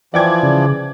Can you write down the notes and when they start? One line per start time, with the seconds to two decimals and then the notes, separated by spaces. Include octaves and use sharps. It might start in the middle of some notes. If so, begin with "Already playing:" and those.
0.14 E3 F3 D5 G5 G#6
0.43 C#3